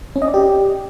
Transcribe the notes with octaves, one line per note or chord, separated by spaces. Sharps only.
C#4
D#5
D5
G4